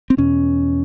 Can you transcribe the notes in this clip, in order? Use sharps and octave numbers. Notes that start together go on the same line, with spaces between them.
C4
E2 B2 C#4